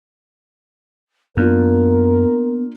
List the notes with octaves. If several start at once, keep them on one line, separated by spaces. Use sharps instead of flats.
F#2 A#3 B3 D4 F4 A#4